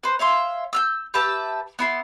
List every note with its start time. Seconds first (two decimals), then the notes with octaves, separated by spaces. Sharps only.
0.04 B4 C5
0.19 C#5 E5 F5 C6
0.73 E6 F6 G6
1.14 G4 B4 E5 A5
1.79 B3 E4 C6